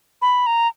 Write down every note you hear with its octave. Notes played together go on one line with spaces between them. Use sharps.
B5
A#5